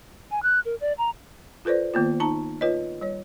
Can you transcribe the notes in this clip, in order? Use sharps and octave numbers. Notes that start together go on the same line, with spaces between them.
G#5
F#6
A#4
D5
A#5
F4 A4 B4 C5 D5
D#3 A#3 B3 F4
D#4 A5 A#5
F4 B4 C#5 D#5
G3 C#5